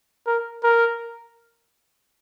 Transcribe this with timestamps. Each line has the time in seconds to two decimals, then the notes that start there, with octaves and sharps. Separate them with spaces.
0.27 A#4
0.63 A#4